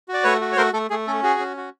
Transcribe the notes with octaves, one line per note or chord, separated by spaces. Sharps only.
F#4
D5
A3 B4 C#5
F#4
C#5
A3 A#4 C5
A3 A4
A3 G#4
C#4 A4
F#4 G#4
C#4
F#4